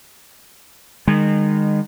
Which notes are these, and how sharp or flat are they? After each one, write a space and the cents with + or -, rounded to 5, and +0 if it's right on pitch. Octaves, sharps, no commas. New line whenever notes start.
D#3 -25 G#3 -35